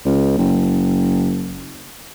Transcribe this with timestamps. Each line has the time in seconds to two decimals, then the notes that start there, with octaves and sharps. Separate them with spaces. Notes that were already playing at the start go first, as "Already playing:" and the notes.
0.05 C#2
0.38 F#1